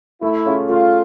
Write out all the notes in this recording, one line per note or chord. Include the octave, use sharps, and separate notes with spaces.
A3 E4
C#4 F4 G#4
A3 F4